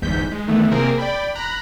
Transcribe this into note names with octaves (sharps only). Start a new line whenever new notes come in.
G1 E2 G#2 G6 B6
G#3
D#3 E3 A3 B3
C3 A#3 C4 G#4 A#4
D5 G5 B5
A#5 B5 F#6